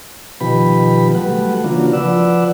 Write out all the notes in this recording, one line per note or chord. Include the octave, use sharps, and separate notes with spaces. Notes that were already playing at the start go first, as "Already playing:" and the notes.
B2 D#3 F3 G4 B4 B5
F#3 G3 A3 B4 F#5
C#3 E3 A#3 D4 F4 F#4
F3 B4 D5 F#5 E6